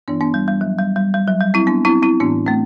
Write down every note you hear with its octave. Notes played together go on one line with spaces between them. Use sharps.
G2 E3 B3 D4
B3 D4
G3
G3
F#3
G3
G3
G3
F#3
G3
C4 E4
B3 D4
C4 E4
C4 E4
A2 E3 B3 D4
A3 C4